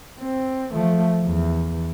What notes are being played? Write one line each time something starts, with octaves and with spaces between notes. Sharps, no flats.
C4
F3 A3
E2